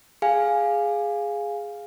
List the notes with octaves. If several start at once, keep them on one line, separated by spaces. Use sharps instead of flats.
G#4 F5 G#5